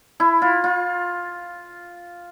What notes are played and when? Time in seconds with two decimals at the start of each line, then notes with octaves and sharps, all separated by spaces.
0.20 E4
0.42 F4
0.64 F4